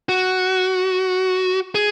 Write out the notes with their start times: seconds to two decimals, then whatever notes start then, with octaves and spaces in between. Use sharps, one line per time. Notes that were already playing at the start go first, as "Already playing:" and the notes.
0.09 F#4
1.75 G#4